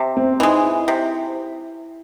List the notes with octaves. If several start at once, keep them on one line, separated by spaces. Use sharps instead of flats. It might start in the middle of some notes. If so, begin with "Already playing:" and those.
Already playing: C3
C4
E3 G#3 D#4
E4
C3